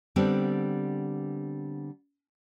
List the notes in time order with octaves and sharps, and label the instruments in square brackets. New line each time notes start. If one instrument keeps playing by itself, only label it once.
[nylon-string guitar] D3 G3 B3 C4